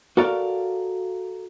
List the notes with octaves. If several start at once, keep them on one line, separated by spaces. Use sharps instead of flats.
F#4 A4 A#4 D5 F5